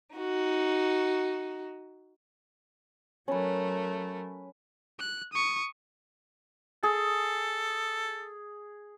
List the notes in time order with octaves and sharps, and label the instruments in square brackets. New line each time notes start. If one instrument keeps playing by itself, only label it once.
[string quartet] D#4 F#4
[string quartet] F#3 A3 A#4 [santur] C#4 B4
[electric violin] F#6
C#6 D#6
[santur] G#4 [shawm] A4